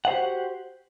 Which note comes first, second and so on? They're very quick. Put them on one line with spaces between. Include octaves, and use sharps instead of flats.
F#5 C5 G4 F#4